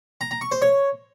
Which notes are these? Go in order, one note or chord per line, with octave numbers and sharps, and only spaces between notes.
A#5
A#5
C#6
C5
C#5